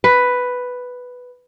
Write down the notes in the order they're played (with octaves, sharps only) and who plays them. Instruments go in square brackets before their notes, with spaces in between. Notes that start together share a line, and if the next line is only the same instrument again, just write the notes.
[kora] B4